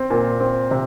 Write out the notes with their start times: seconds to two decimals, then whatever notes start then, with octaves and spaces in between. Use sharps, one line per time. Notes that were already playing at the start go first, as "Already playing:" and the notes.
Already playing: C4
0.10 A#2
0.40 C4
0.71 C3